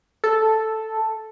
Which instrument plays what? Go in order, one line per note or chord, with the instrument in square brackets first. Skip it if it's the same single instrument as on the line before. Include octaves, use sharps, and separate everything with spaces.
[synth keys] A4